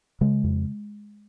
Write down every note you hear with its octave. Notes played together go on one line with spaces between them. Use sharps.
C#3 G#3
F2